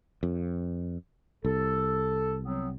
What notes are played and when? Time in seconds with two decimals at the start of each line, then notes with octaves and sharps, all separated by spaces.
0.23 F2
1.45 C2 A4
2.44 F#3 B3 C4